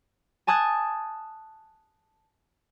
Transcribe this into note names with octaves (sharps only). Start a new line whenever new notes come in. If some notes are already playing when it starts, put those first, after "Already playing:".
G#5 A5 D#6 F#6 G#6 A6